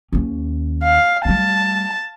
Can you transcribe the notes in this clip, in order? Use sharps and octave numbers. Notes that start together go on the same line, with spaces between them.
D#2 C#4
F5
G3 A3 A5